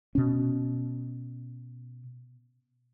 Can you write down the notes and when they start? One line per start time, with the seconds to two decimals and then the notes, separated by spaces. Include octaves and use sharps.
0.15 B2 C#4